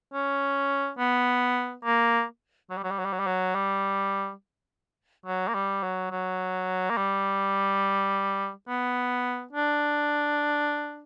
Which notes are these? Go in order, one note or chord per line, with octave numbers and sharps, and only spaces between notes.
C#4
B3
A#3
F#3
G3
F#3
G3
F#3
G3
F#3
G3
F#3
G3
F#3
A#3
G3
F#3
F#3
A#3
G3
B3
D4